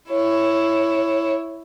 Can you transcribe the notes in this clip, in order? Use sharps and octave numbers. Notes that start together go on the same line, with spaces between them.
E4 C#5